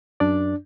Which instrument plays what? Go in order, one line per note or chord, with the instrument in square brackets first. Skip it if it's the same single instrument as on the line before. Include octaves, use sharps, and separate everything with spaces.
[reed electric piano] F#2 D4 D5